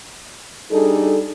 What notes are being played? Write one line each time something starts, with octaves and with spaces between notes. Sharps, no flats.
G3 D4 D#4 G#4 A4